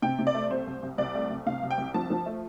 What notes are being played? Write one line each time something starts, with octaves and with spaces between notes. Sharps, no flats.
C3 G5
C3
D5
A3
C2 C5
C2
C2
C2 D5
A3
C2
C3 F5
C2
G5
C2
F3 A5
F3
A3